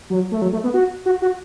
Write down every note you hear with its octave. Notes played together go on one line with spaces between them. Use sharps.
F#3
A3
F#3
A3
B3
F#4
F#4
F#4